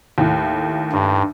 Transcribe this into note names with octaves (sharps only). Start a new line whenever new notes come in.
D#2 A2
G2